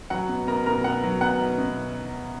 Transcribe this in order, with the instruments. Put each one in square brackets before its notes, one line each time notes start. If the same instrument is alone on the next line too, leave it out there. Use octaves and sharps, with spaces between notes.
[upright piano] F#3 F#5
B2
B2 A#4 A#5
B2 A#4 A#5
B2 F#5
F#3
B2 F#5 F#6
B2
B2